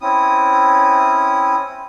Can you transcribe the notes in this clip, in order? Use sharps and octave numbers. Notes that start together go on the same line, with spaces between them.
C4 C#4 E4 D#6